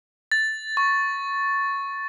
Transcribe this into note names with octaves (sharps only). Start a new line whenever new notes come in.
A6
C#6